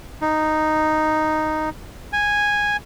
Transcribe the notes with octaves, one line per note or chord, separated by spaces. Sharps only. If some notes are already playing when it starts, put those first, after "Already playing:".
D#4
G#5